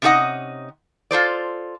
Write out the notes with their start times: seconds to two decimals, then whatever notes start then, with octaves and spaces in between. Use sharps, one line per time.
0.02 C3 C#4 D#4 F#4 D#5 F#5
1.11 F4 A4 C5 D5